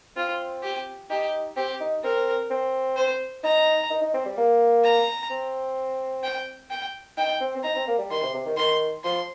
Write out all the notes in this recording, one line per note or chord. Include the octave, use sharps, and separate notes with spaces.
C4 F4
G4
D#4 G4
C4 G4
D#4
C4 A#4
C4
C5
D#4 A#5
D#4
D#4
C4
G3
A#3
A#5
C4
G5
G5
D#4 G5
C4
C4
D#4 A#5
C4
A#3
G3
D#3 C6
C3
C3
D#3
D#3 C6
F3 C6